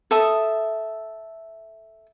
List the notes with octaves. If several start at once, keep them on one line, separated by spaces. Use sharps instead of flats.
A4 E5 D#6